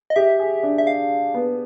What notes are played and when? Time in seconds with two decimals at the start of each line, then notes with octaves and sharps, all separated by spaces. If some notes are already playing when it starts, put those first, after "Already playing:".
0.10 D#5
0.16 G4 E5
0.39 G#4
0.63 D4
0.78 E5
0.87 F5
1.34 B3